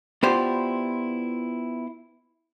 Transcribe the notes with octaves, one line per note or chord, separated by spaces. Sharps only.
B3 E4 F4 G4 C5 D5